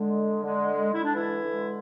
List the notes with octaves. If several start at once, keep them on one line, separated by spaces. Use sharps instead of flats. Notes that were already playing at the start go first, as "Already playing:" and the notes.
Already playing: D3 G#3
D3 G#3
D3 G#3 E4
D4
E3 E4
D3 G#3